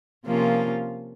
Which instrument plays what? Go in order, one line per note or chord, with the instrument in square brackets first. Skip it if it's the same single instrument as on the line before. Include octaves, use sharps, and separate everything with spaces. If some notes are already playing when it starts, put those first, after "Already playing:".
[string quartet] C3 F3 A#3 C#4 F4